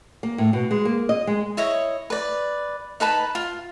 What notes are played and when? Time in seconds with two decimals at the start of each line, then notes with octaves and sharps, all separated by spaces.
0.23 A#3
0.38 A2
0.53 B2
0.71 G#3
0.85 A#3
1.09 D#5
1.27 G#3
1.57 E4 C#5 D#5
2.10 B4 D5
3.00 D#4 B4 A5 B5
3.35 F4